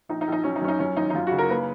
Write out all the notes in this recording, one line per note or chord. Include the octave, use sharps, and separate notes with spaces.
A#1 D#4
D#4
A#1
D#4
F#3 C#4
D#4
F#2 C#4
D#4
F#2 C#4
G#1 D#4
D#4
F#2 F4
C#3 F#4
A#4
A#3 B4